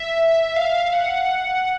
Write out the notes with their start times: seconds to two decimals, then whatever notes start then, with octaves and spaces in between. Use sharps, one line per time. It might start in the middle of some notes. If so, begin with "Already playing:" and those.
Already playing: E5
0.56 F5
0.93 F#5